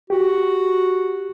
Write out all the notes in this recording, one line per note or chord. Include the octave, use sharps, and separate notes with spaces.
F#4 G4